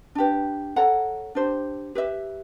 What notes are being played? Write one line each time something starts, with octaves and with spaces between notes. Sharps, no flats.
D4 G4 B4
A4 C#5 F#5 A#5
D4 G4 C5
G4 B4 E5